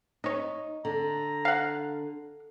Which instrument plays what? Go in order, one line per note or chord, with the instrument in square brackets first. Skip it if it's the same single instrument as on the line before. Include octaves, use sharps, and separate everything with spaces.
[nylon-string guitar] D#4 [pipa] C#5 D#5
[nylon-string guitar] D3 [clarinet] A#5
[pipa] F5 F#5